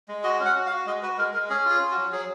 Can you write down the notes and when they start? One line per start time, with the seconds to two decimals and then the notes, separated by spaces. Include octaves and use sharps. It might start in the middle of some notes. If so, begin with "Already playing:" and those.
0.08 G#3
0.24 F#4 D#5
0.40 C#4
0.45 F#5
0.56 F#4
0.66 F5
0.71 F#4
0.86 G#3 D#5
1.02 F#4 B4
1.18 G#3 A#4
1.33 G#3 A#4
1.50 C#4 G#4
1.65 F4 G#4
1.80 C#4
1.91 F#4
1.97 F#3
2.12 F#3 G#4